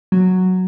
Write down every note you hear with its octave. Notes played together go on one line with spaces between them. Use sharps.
F#3